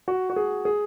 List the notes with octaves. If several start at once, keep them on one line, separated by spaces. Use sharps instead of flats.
F#4
F#4
G#4
G#4